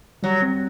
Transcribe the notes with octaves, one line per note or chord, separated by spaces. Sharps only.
F#3 G3
C4